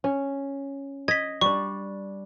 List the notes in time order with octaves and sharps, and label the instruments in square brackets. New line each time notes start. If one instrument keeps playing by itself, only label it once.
[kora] C#4
[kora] D#5 [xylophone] G#6 B6
[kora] G3 D4 [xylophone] C#6